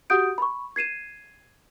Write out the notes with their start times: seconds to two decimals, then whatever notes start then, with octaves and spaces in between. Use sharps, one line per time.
0.10 F#4 G4 F#5 D#6 G6 D7
0.38 B5 C#6
0.76 G#6 C7 D#7 E7